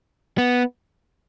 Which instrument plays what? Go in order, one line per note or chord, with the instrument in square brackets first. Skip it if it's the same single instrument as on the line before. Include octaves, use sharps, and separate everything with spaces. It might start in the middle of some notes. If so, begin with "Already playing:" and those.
[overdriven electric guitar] B3